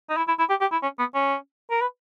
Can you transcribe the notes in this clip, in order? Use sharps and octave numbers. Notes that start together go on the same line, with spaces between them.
D#4
E4
E4
E4
G4
G4
E4
C#4
B3
C#4
A#4
B4